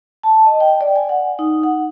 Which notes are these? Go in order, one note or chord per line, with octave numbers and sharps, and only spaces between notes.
A5
D#5
G5
D5
G#5
F#5
D#4
F#5